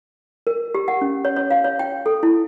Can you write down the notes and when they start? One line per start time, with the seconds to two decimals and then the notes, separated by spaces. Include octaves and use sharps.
0.47 A#4
0.75 G4
0.88 F#5
1.01 C#4
1.25 C#5
1.36 C#5
1.51 F5
1.64 C#5
1.79 G5
2.06 A4
2.23 E4